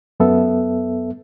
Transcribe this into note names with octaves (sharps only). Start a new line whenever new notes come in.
F#2 B3 A4 E5